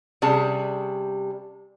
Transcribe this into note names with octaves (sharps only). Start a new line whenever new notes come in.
C3 G3 C#4 G#4 A5